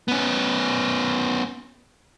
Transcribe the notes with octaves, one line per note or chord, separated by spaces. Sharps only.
B3 C#4